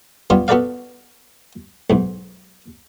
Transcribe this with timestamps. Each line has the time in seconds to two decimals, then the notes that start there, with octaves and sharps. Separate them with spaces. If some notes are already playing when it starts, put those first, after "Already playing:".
0.30 G3 B3 F4 C#5
0.48 B3 F#4 A4 B4 D5 F5
1.90 B1 G#2